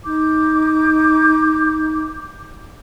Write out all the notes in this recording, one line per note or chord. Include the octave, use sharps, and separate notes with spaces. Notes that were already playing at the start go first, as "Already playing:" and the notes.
D#4 D6 G6